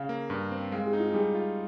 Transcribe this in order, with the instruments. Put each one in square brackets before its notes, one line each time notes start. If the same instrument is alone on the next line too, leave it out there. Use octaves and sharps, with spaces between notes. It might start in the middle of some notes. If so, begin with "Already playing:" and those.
Already playing: [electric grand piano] C#3 [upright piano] F5
[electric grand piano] A#3
G2
C4
[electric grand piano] G#3 [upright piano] F5
[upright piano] G#4
[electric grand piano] D#4
[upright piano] F4
[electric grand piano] G3 [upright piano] G#4
[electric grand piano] F4